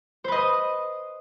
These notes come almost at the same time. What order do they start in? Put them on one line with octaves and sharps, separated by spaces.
C5 B4 D#5 D#6